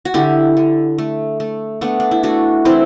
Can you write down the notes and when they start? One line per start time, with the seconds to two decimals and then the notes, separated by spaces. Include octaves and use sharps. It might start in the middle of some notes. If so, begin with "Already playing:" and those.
0.05 F#4
0.14 D3 E4 G4
0.57 D3
0.98 A3
1.40 A3
1.81 A3 B3 D4
2.00 D4
2.11 E4
2.23 A3 D4 F#4
2.65 E3 C4 E4